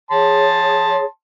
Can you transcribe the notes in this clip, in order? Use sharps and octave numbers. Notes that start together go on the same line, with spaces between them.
G#4 C#5 A5 C6